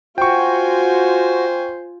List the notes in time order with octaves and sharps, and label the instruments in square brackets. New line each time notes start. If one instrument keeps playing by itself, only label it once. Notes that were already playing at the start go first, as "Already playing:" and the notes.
[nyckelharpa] F4 G#5 [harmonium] F#4 [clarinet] C5 [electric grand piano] G5 C#6